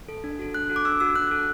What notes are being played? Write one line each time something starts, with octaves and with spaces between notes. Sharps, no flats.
A4
D4
F#4 A4
D4 F#6
F#4 A4
D6
D4 E6
F#4 A4 E6
D4 F#6
F#4 A4